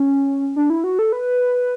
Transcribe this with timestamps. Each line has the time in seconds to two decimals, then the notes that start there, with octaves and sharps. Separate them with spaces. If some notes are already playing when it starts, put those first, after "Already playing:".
Already playing: C#4
0.56 D4
0.70 E4
0.84 F#4
0.99 A4
1.12 B4